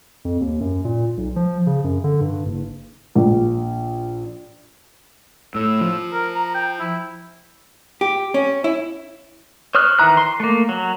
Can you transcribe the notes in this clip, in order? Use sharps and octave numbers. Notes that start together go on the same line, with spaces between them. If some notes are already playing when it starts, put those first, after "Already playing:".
F2
D#2
F#2
A#2
B1
F3
C#3
F#2
D3
G2
F#1
A#1
A2 E6
F3
A#4
A#5
G5
E4
G4
C#4
E4
C5 C#5 D#6 F6 F#6
D#3 E3 A#5 F#6
C6
A3 A#3
F#3